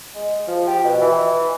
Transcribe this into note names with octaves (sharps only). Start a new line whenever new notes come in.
G#3
F3
G4
B2
E3